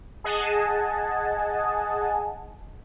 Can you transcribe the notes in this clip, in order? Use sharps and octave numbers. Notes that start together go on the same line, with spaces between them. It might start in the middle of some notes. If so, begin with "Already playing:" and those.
G#4 D#5 F#5 G#5 A5